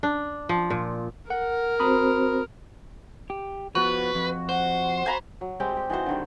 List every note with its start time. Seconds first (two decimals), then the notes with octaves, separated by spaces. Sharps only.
0.03 D4
0.49 F3
0.70 A#2
1.30 A#4 F#5
1.80 C4 F#4 C5 A#5 B5 D#6
3.30 G4
3.75 F3 B3 F#4 B4
4.15 F2
4.49 C5 F#5
5.06 G#5 A#5 B5
5.41 F#3
5.60 G3 G#3 C4 G4
5.77 G4
5.90 E3 D#4 F#4 C5
6.06 D3 D#3 G3